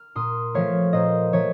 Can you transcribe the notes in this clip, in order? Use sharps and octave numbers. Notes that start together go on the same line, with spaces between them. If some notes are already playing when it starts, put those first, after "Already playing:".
Already playing: F6
A#2 C6 D#6
F3 A3 C#5 F5
A#2 C5 D#5
F3 A3 C#5